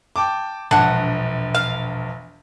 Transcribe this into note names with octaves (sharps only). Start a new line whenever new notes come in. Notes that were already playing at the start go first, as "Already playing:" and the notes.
G5 A5 D6
E1 A#1 D4 F#5
F5